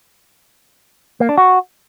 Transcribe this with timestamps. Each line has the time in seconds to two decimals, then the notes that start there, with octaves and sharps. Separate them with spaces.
1.20 A#3
1.29 D4
1.38 F#4